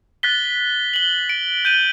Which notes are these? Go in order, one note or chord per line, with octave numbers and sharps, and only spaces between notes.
F#6 A6 B6 G7
F#7 G7
D7
G6 D#7 G7